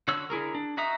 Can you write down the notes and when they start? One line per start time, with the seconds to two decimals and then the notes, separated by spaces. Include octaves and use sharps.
0.08 D3 F#4 C#5 E6
0.30 D3 E4 G#4 A#4
0.55 D4
0.77 D#4 F#4 E5 A#5 D#6